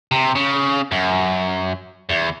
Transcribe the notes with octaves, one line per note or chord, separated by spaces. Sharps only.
C3
C#3
F#2
E2